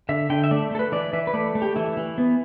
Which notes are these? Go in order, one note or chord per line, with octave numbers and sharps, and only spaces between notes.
D3 E5
D3 G5
E5
A3 D5
A3 A4
B4
E3 D5
E3 E5
B4
A3 D5
A3
G4
E3 E4
E3
B3